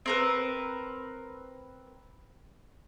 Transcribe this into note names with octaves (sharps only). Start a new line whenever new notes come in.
C4 A#4 B4